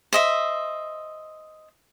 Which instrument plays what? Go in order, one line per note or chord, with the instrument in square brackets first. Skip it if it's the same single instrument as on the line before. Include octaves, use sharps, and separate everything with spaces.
[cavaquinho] C5 D#5 E5